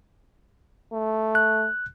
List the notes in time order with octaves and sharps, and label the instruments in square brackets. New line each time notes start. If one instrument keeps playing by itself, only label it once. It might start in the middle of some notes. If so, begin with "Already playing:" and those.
[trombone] A3
[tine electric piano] F#6